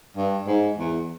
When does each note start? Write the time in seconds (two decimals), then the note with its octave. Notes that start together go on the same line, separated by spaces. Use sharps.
0.17 G2
0.47 G#2
0.77 E2